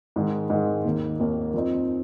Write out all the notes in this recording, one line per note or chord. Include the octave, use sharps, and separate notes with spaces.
G#2 D#3 G#3
G#2 D#3 G#3
D#2 D#3 A#3
D#2 D#3 A#3
F2 F3 C4 D#4